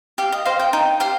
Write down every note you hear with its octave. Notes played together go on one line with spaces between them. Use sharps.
G4 F5
D#5
C5 D#5 F5
G5
D#4 G5
G4 C5 F5